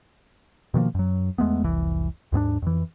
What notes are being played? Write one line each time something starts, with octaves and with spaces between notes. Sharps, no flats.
B2 D#3 F3 A#3
F#2 F#3
E2 G#3 A3 B3
F1 C2 E3
D#2 G#2 B3 D4
F2 E3